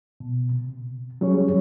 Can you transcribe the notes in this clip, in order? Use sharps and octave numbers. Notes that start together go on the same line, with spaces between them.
B2
C3
F#3 G3 C#4 G#4 C#5